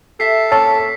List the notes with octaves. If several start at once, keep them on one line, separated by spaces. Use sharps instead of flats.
G4 A4 E5 B6 C7
A#3 C4 C#4 C#5 A5 E6